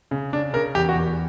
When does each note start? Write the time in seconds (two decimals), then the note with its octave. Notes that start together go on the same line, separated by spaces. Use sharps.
0.11 C#3
0.33 C#3 D4
0.53 C#3 A#4
0.75 E2 G4
0.89 F#4
0.95 E2